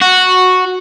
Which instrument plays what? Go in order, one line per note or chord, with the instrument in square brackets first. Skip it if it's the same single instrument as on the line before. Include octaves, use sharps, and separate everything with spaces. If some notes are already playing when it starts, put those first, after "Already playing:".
[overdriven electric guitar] F#4